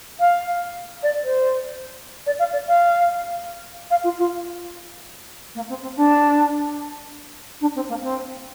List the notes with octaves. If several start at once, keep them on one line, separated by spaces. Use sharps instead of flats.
F5
D5
C5
D5
F5
D5
F5
F5
F4
F4
A#3
C4
C4
D4
D4
C4
A#3
C4